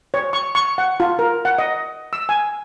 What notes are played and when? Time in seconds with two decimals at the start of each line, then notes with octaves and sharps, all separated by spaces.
0.14 C#5
0.33 C#6
0.55 C#6
0.78 F#5
1.00 F4
1.19 A#4
1.45 F#5
1.58 D#5
2.13 E6
2.29 G#5